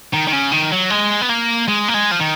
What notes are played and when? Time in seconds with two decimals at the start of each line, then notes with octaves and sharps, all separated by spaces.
0.13 D#3
0.27 D#3
0.33 C#3
0.52 D#3
0.72 F#3
0.90 G#3
1.21 B3
1.29 A#3
1.68 G#3
1.88 A#3
1.94 G#3
2.12 F3
2.20 D#3